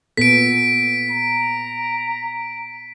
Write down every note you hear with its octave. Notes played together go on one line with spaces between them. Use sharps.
A#2 B3 A4 B6 D7
A#5